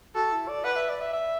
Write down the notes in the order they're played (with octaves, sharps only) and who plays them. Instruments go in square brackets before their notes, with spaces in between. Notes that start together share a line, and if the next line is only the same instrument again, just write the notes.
[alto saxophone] F#4 [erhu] A4
[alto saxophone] E4
D5
[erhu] B4 [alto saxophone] F#5
[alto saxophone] E5
D5
E5
E5